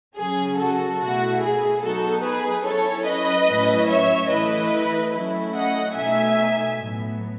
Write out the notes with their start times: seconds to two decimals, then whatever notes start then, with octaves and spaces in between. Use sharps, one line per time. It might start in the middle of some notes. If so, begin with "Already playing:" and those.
0.16 C#3 F#3 C#4 G#4
0.57 F#4 A4
0.99 B2 A3 E4 F#4
1.40 G#4
1.81 F#3 B3 D#4 F#4 A4
2.23 G#4 B4
2.64 F#3 C#4 E4 A4 C#5
3.06 B4 D#5
3.48 A2 F#3 C#4 E4
3.88 C#5 E5
4.30 E3 A3 E4 B4 D#5
5.13 F#3 A3 C#4 E4
5.55 D#5 F#5
5.96 B2 A3 D#4 E5 G#5
6.78 A2 F#3 B3